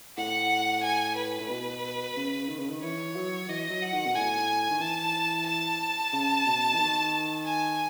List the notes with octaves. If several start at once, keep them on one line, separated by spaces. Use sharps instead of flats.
A2 F#5
G#5
B4
A2
B2
C#3
D#3
C#3
D#3
E3 C#5
F#3
E3 D#5
F#3
F#5
D#3
B2
A2 G#5
D#3
E3 A5
A5
C#3
B2
E3
D#3
G#5